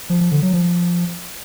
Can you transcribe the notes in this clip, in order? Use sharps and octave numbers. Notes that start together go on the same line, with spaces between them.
F3
F3
D3
F#3
F3